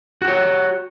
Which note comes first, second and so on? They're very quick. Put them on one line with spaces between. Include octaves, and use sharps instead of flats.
F#4 G4 C#5